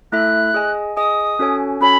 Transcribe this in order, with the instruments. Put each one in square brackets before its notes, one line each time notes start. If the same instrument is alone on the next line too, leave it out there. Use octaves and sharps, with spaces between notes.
[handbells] A3 E4 A4 E5 [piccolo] F#6
[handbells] G#4 D#5 G#5
[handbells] G#4 D#5 G#5 [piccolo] D#6
[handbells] C#4 F#4 A4 C#5 G#5
[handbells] C#4 F#4 A4 C#5 G#5 [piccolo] B5